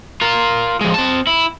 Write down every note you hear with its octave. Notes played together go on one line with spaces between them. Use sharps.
F4 A#4
F3 G#3
C4 A5
E4